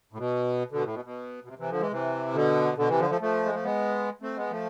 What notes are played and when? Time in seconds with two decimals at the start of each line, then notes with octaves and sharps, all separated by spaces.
0.13 A2
0.18 B2
0.72 B2 D3
0.84 A2
0.94 B2
1.05 B2
1.44 B2
1.48 C3
1.58 C3 E3
1.70 D3 F3
1.80 E3 G#3
1.91 C3 E3
2.34 B2 D3
2.77 B2 D3
2.89 C3 E3
2.99 D3 F3
3.10 F3 A3
3.21 F3 A3
3.45 G#3
3.55 A3
3.64 G#3 B3
4.21 A3 C4
4.36 G#3 B3
4.51 F3 A3